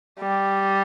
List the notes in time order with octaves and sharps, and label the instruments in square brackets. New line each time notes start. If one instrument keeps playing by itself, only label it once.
[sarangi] G3